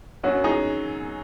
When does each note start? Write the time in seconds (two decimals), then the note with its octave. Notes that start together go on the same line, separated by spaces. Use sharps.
0.24 F#2 F#3 C#4 F#4
0.44 D#4 G#4